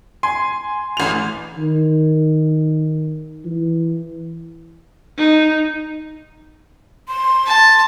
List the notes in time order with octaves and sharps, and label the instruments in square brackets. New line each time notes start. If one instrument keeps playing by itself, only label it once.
[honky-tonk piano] G#5 [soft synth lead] C6
[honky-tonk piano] A1 F7
[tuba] D#3
E3
[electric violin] D#4
[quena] C6
[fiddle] A5